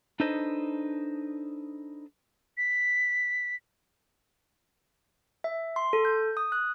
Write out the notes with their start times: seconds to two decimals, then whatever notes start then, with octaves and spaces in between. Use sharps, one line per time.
0.20 D4 D#4 A4 B4 C5 D#5
2.58 B6
5.44 E5
5.76 C6
5.93 A4
6.05 G6
6.37 D#6
6.52 F#6